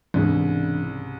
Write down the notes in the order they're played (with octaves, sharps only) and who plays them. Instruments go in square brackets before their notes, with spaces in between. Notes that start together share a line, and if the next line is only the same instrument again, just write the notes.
[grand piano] C2 C#3 [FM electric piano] G#2 [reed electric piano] E3 D4